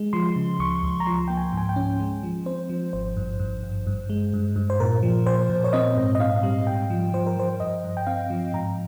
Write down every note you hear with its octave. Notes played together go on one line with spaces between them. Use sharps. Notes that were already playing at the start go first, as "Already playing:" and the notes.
Already playing: G#3
F3 C6
C#3
C#2 C#6
C#2
A#5
F3 C6
A#3 G5
G#5
G#2 G#5
G5
C#4
G#3
F3
C4 C5
F3
G#1 C5
G2
G2
G#1
G2
G#3
G2
G2
C5
A#2 A#4
F3
A#2 C5
A#2
C#5
C4 D#5
G#2
D#5
C4 F5
G3
G#2 G5
F3
F3 C5
A#4
F3 C5
G2 D#5
G2
G5
C4 F5
F3
G#2 A#5